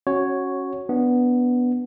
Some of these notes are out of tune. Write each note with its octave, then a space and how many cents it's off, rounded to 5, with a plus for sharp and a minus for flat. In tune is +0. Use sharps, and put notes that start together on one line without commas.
C#4 -15 F#4 +0 C#5 +0
B3 +0 D4 -10